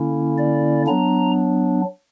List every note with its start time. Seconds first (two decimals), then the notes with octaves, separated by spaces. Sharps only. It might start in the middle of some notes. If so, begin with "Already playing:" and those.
Already playing: D3 A#3 C#4 E4
0.38 D5
0.87 F#3 B3 D4 A#5